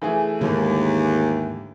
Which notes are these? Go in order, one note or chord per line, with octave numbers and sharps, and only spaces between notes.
E3 A3 G#4
D#2 G#2 D3 G#3